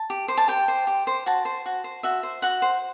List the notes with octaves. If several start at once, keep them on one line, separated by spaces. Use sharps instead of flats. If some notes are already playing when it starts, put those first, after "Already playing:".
Already playing: A5
G4
C5
A5
G4 G5
C5
G4
C5
F#4 A5
C5
F#4
C5
F#4 E5
C5
F#4 F#5
C5